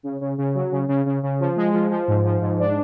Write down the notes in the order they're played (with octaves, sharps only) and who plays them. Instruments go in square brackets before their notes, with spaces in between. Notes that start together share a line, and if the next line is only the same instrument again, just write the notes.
[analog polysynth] C#3
C#3
C#3
F#3
C#3
C#3
C#3
C#3
F3
G#3
F3
F3
G#2
F3
G#2
D4